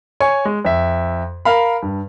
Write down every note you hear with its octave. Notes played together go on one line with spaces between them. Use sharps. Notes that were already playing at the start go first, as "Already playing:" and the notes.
C#5 G#5 C#6
G#3
F2 E5
A#4 F5 B5
G2